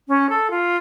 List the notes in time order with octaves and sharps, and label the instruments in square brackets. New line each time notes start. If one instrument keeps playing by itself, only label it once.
[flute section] C#4
A4
F4